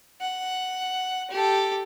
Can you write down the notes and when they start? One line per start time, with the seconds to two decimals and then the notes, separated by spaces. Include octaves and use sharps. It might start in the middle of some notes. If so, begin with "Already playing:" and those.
0.21 F#5
1.30 G4 A4